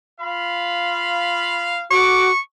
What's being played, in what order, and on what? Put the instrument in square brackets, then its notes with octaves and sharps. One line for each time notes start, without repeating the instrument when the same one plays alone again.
[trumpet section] F4 F5 B5
[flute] F#4 [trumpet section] A4 D6 [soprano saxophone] C#6